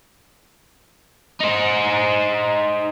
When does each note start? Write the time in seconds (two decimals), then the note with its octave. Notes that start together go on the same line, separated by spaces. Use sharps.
1.40 D#4 C5